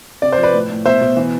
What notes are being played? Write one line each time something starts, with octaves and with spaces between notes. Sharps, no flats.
C3 D5
C5
F3
B4 D5
A2
A2
B2 C5 E5
B2
E3